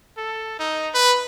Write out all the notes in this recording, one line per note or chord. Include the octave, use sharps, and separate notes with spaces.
A4
D#4
B4